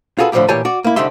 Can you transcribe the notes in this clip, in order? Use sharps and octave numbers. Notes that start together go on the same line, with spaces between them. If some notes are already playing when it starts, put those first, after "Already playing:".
F4 F#4 G#4 A4 B4
A2 D3 F3 G3 A3 G4
A#2 E3 G4 C#5 G#5 A5
F#4 D5
A#3 E4
C2 D3 D#4 G4 E5 C6